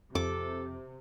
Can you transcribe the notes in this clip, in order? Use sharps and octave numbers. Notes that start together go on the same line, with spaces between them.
F2 C3 A4 D6